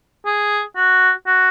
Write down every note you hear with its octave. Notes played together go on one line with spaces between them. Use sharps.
G#4
F#4
F#4